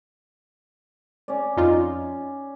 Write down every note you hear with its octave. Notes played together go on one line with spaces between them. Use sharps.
C#4 D5
F2 D#4 F4